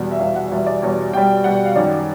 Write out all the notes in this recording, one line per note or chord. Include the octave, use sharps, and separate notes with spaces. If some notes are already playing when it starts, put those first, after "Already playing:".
Already playing: E2 B2 G3
E5
E2 B2 G3 F5
F#5
E2 B2 G3 E5
D5
E2 B2 G3 C#5
B2 G3 G5
B2 G3 F#5
F5
F#2 D#3 G3 D5